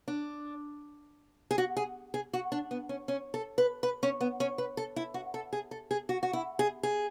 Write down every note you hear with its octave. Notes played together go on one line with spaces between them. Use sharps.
D4
G#4
F#4
G#4
G#4
F#4
D4
B3
C#4
C#4
A4
B4
B4
C#4
B3
C#4
B4
A4
E4
F#4
A4
G#4
A4
G#4
F#4
F#4
E4
G#4
G#4